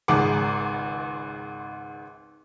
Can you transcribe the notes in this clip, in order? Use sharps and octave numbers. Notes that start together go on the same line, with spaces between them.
G#1 C#2 G#2 G#4 F#5 D6